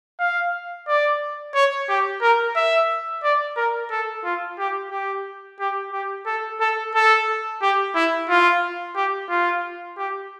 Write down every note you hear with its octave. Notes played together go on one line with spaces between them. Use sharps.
F5
D5
C#5
G4
A#4
E5
D5
A#4
A4
F4
G4
G4
G4
G4
A4
A4
A4
G4
E4
F4
G4
F4
G4